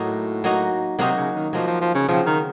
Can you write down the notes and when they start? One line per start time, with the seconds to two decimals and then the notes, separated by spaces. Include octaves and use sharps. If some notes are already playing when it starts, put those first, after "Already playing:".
Already playing: A2 F#3 A#3 D#4 F#4
0.44 F#3 A#3 D#4 F#4
0.99 C3 F#3 A#3 D#4 F#4
1.17 C#3
1.36 D#3
1.53 F3 F#3 A#3 D#4 F#4
1.67 F3
1.81 F3
1.95 C#3
2.08 C#3 F3 F#3 C4
2.26 D#3